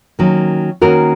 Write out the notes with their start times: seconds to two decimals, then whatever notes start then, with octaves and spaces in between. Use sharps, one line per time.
0.19 D#3 F#3 A#3 C#4
0.81 D#3 A#3 C#4 F#4 A#4